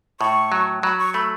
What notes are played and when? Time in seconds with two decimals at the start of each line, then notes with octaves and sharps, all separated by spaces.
0.20 A2 C#6
0.52 F#3
0.83 F#3 B5
0.99 C#6
1.14 A3 B5